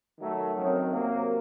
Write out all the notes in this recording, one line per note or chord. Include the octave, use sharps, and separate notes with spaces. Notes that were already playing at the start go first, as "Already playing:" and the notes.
D#3 F#3 A3
F#2 D#3 F#3 C4
C3 F#3 A#3